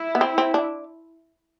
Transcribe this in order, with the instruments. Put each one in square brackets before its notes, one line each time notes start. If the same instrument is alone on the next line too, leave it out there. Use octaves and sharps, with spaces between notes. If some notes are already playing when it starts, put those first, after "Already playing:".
Already playing: [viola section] E4
[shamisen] B3
C4
C4
D4